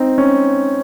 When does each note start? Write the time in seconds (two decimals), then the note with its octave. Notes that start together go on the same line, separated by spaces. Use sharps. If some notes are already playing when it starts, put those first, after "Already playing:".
Already playing: C4 D#4
0.18 C#4